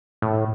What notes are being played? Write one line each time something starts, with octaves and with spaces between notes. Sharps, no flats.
A2